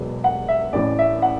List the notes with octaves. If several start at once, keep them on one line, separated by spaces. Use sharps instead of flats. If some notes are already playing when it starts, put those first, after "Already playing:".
Already playing: E1 E2 B2 F#3 B3
F#5
E5
A1 A2 E3 A3 C#4 D5
E5
F#5